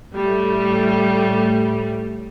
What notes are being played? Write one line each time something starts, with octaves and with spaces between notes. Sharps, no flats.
A2 G3 A3